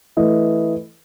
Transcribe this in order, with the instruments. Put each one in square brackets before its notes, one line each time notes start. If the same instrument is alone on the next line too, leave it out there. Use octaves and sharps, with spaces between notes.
[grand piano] E3 A3 E4 B4 D#5